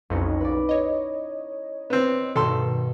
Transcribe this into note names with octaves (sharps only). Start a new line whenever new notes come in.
B1 F2 C#4 D#4 E4
B4 D5
C#5 D#5
B3 C4
G2 B2 D#3 A4 C6